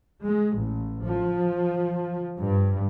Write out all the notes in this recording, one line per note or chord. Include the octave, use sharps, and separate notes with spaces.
G#3
A1
F3
G2